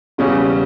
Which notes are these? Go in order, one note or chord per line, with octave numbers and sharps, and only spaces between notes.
E1 E2 C#3 G3 C#4